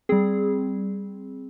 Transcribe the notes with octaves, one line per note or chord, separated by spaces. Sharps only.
G3 C4 G#4